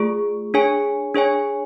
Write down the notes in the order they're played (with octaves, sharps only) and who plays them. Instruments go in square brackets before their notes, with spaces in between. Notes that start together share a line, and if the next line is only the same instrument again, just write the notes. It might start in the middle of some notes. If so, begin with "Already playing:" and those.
Already playing: [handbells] A3 F4 G#4
D4 G#4 C#5 G#5
D4 G#4 C#5 G#5